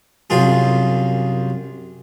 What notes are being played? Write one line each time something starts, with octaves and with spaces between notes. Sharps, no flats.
C2 F#2 F4 G#4